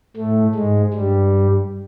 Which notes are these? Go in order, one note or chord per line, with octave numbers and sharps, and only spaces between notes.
A2 A3
G#2 G#3
G2 G3